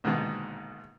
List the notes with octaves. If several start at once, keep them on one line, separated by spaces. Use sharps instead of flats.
A#1 G#2 B2 D3 D#3